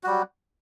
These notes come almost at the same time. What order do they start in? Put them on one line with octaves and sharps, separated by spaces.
F#4 G3 F#3